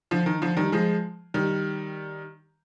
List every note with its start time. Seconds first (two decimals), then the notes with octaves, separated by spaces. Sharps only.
0.11 D3 F3
0.26 D#3
0.42 D3 F3
0.57 D#3 G3
0.72 F3 G#3
1.34 D#3 G3